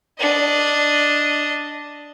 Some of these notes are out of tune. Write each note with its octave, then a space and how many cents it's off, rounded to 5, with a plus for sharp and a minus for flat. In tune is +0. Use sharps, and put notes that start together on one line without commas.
D4 +0 D#5 +0